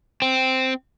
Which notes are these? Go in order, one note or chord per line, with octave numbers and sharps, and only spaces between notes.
C4